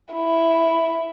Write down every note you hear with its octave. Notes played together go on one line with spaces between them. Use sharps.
E4